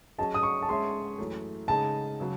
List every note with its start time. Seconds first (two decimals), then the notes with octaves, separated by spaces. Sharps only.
0.18 F#3 C#4 G#4 D#5 A5
0.34 D#6
0.43 C#6
0.62 A5
0.68 G#3 C#4 G#4 C#5 E5 C6
1.18 F#2 E3 A3
1.68 C#3 G#3 D#4 G#4 D#5 A5
2.20 C#3 F#3